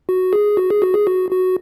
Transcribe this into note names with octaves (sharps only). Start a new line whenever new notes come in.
F#4
G#4
F#4
G#4
F#4
G#4
F#4
F#4